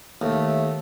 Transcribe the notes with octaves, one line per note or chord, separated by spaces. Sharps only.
D#2 A3